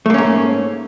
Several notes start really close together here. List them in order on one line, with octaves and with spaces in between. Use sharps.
A3 A#3 C#4 G#2